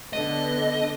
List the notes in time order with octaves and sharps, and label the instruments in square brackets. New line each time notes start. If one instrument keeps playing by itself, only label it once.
[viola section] D3 B3 [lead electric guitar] D#5